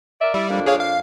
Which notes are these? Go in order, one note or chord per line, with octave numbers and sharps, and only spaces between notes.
A#4 D5 E5
G3 E4 D5 E5
F2 A#3 D4
G#4 C#5 F5
F5